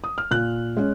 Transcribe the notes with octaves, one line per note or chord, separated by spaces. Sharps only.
D#6
F6
A#2 F#6
G#3 C#4